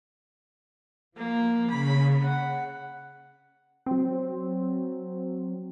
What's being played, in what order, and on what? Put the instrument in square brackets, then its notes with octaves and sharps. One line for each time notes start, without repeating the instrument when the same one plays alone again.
[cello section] F3 [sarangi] A#3
[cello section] C#3 [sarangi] B5
[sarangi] F#5
[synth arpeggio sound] F#3 C4